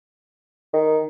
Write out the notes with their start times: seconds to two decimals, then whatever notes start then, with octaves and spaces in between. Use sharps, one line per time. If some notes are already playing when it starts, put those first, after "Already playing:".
0.73 D#3